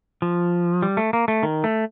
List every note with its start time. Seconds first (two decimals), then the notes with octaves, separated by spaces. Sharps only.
0.22 F3
0.82 G3
0.97 A3
1.13 A#3
1.28 A3
1.43 D#3
1.64 A3